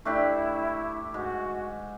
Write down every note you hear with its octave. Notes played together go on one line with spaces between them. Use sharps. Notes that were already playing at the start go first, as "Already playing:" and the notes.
A3 D4 E4 G4
G#2 F#4